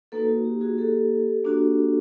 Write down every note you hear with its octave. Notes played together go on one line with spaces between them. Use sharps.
A#3 D#4 F#4 A4 B4
F#4
G4
F#4 G#4
G4 A4
A#3 D4 F#4